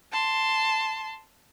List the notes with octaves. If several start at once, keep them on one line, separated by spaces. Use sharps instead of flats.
A5 C6